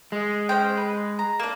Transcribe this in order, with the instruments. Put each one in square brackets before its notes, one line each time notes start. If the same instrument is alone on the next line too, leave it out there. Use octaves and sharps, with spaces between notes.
[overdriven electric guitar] G#3
[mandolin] C#4 C5 G5
B4
A#5
A#3 D4